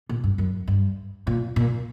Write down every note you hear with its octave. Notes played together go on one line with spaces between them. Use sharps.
A#2
G2
F#2
G2
A#2
A#2